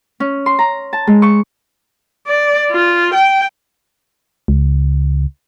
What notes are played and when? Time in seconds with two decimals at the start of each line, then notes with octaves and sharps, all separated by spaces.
0.20 C#4
0.46 C6
0.59 A#5
0.93 A5
1.07 G#3
1.22 C#6
2.27 D5
2.71 F4
3.14 G5
4.48 C#2